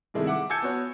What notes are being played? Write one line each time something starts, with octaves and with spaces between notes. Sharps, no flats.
G2 C3 D#3 G#3 A3 E4
E5 F#5 D6
G#5 A5 E6 G6 G#6 C#7
B3 F#4 C#5